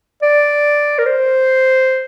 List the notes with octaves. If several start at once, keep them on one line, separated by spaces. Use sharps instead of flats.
D5
A#4
C5